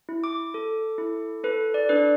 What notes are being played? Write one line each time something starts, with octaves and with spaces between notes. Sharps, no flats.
E4
D6
A4
E4
A4 B4
D5
D4 B4
D5